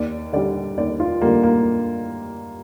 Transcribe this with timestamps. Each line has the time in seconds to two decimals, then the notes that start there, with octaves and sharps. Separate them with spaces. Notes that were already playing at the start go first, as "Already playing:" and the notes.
Already playing: D#2 D5
0.33 D3 G3 D5
0.77 D#2 D5
1.00 F4
1.21 D3 G3 A#3
1.43 A#3